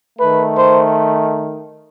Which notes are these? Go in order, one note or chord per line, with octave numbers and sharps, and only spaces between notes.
D#3 A3 B4
C5